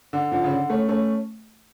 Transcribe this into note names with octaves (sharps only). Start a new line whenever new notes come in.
D3
D3 F3
C#3
D3
A3 C#4
A3 C#4